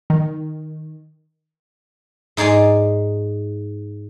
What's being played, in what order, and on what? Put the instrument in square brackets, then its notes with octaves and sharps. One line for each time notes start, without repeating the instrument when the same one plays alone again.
[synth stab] D#3
[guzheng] G#2 D#4 G#4 D5 G#5